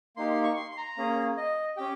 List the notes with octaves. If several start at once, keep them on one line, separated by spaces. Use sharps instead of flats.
A#3 D#4 G4 C6
C6
C#6
C6
C6
A#5
A#3 C#4 G#4
D#5
C#4 G4 G5